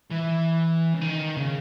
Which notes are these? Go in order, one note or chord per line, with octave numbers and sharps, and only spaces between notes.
E3
C#3
D#3
C#3